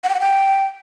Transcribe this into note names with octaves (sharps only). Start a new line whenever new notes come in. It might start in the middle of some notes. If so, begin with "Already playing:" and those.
F#5
G5
F#5
G5